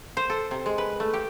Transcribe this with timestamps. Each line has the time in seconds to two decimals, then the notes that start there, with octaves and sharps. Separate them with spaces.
0.17 C5
0.30 A4
0.51 C3
0.66 G#3
0.78 B4
1.00 A3
1.13 G4